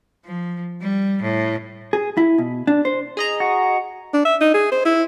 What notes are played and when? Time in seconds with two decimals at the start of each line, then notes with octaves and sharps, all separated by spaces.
0.25 F3
0.81 G3
1.22 A2
1.93 G#4
2.17 E4
2.38 B2
2.67 D4
2.85 C5
3.17 G#4 D#5 A#5
3.40 F#4
4.14 D4
4.25 E5
4.41 D#4
4.54 G#4
4.71 C5
4.85 E4